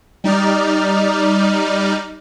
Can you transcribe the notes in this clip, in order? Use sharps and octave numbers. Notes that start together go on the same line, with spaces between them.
G3 D#4 D5 F6